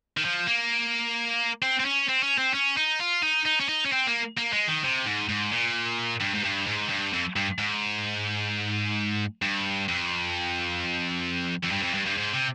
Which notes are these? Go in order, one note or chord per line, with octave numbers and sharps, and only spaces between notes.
D#3
F3
A#3
C4
C4
C#4
C4
C#4
C4
C#4
D#4
F4
D#4
D#4
C#4
D#4
C#4
C4
A#3
A#3
G#3
D#3
C3
G#2
G#2
A#2
G2
G#2
G2
G#2
G2
F2
G2
G#2
G2
F2
F2
G2
F2
G2
G2
G#2
C3